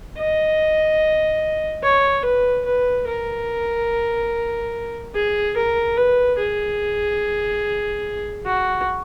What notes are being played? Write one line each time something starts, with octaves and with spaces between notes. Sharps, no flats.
D#5
C#5
B4
B4
A#4
G#4
A#4
B4
G#4
F#4